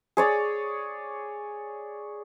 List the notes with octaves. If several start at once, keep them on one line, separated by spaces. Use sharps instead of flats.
G#4 C#5 D5